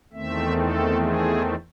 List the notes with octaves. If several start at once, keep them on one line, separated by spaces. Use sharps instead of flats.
E2 D#3 A3 C4 E5
A4
G#4